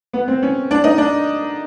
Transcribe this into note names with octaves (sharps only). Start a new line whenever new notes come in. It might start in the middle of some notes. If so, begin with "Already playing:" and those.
B3
C4
C#4
D4
D#4
D4